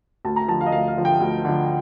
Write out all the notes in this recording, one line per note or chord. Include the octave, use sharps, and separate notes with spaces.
D2 A5
A#5
D3 F3 A5
F5
D#5
D2 F5
F5
D3 F3
G5
D2
D3 F3